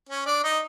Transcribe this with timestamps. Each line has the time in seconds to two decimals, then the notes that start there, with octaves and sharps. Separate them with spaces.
0.09 C#4 C#5
0.26 D4 D5
0.43 D#4 D#5